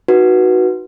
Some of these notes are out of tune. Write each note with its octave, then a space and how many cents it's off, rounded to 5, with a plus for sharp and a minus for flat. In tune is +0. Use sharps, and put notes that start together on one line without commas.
D#4 +15 F#4 +0 B4 -20